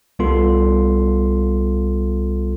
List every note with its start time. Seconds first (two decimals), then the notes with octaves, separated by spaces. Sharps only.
0.19 C2 G3 B3 F4 A4 C6